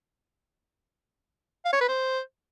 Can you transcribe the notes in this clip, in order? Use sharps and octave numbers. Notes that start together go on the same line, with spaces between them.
F5
C#5
B4
C5